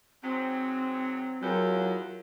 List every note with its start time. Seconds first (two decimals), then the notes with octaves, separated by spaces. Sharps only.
0.23 G#2 C3 F#3 C4
1.42 E2 F#3 F4 A#4